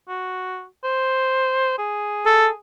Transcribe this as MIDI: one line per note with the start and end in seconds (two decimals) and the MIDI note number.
0.09 0.65 66
0.84 1.77 72
1.78 2.56 68
2.26 2.48 69